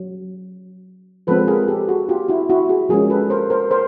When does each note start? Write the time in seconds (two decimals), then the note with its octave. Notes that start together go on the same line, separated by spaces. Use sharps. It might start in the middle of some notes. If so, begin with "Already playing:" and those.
Already playing: F#3
1.27 F3 G#3 C4 A4 B4
1.47 G#4 A#4
1.68 G4 A4
1.89 F#4 G#4
2.09 F4 G4
2.28 E4 F#4
2.50 E4 F#4
2.69 F#4 G#4
2.89 F3 G#3 C#4 G#4 A#4
3.10 A4 B4
3.30 A#4 C5
3.50 A#4 C5
3.71 A#4 C5